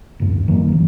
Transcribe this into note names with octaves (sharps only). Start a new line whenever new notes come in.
D1 F#2
D#3 F#3 G#3 A#3
G#1 E3